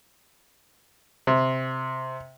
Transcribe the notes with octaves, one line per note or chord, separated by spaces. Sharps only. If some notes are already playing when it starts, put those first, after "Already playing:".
C3